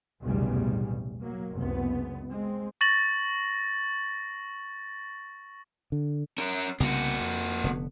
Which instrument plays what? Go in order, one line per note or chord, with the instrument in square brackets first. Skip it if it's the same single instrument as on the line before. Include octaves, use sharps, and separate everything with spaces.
[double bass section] F1 B1 E2 A2 C#3 G3
F#3 A#3
F#1 C#2 C3 B3
G#3 C4
[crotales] C#6 A6 A#6 F#7
[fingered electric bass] D3
[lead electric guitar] C#4 A#4
[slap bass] C2 C#3 B3 [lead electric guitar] A#3 F#4
[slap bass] F2
F1 D3 B3